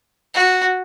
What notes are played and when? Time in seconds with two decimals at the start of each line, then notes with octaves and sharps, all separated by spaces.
0.34 F#4